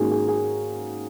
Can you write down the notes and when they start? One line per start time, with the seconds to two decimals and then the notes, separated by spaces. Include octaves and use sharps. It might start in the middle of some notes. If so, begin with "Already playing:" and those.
Already playing: G#2 D#3 A#3 C#4 F#4 G#4
0.11 G#4
0.28 G#4